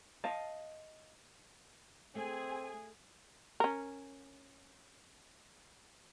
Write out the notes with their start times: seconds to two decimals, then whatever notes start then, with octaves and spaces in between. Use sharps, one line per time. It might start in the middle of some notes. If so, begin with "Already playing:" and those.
0.24 D#5 F5 A5
2.15 A3 C4 G#4 G#5 D#6
3.60 C#4 A#4